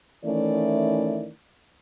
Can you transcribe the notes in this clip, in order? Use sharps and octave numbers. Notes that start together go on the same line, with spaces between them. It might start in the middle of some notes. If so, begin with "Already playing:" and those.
D#3 E3 A3 C#4 E4 D5